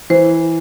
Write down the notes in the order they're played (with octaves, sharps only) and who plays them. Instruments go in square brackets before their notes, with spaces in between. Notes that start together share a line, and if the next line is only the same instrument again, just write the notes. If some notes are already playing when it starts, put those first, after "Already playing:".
[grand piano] E3 [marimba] C5